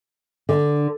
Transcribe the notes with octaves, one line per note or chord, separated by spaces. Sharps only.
D3